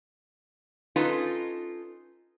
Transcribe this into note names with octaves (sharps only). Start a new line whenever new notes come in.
C#4 D#4 F4 A4 B4